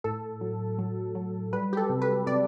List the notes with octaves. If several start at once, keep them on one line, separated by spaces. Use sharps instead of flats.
A2 A4
F#3
F#3
F#3
G3 B4
G4
A4
C3
B4
C3 D5